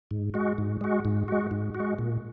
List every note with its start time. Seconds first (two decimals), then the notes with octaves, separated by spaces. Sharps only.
0.11 G#2
0.34 G#3 F#4
0.58 G#2
0.81 G#3 F#4
1.05 G#2
1.28 G#3 F#4
1.51 G#2
1.75 F#4
1.80 G#3
1.99 A#2